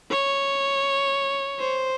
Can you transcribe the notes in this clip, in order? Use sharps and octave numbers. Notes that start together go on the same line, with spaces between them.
C#5
C5